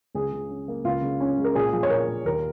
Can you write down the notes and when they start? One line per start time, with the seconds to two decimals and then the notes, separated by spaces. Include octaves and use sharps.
0.15 C#2 G#4
0.32 C#3
0.50 C#4
0.68 A#3
0.85 C#2 F4
1.02 C#3
1.20 C#4
1.38 G#3
1.45 A#4
1.55 A#2 G#4
1.73 F3
1.83 C#5
1.90 A#2 A#4
2.08 A#3
2.25 D#2 A#4